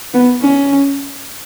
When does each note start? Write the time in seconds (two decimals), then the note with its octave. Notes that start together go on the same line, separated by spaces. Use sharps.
0.14 B3
0.42 C#4